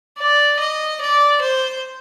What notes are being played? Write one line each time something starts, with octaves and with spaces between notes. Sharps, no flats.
D5
D#5
D5
C5